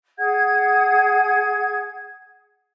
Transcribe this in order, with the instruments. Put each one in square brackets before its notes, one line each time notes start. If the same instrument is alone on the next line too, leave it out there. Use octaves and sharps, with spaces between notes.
[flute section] G#4 F#5 G#6